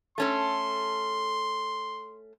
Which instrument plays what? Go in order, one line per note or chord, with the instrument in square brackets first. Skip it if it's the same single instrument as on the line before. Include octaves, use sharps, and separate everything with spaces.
[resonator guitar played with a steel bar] A3 C#4 A4 [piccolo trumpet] C6